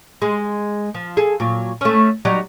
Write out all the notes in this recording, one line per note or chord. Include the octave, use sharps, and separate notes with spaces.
G#3
F3
G#4 A4
A#2 F#3
A3 C#4
F#3 G3 D#4